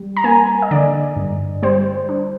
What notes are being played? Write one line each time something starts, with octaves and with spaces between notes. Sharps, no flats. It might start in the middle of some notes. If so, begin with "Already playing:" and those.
Already playing: G3
A#5
A#3 G#5
D#5
D3 D5
G2
G3 C5
D4